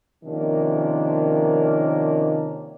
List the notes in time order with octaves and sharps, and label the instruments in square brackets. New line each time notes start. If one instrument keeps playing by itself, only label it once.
[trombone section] C3 D#3 F3 A#3 C#4 D4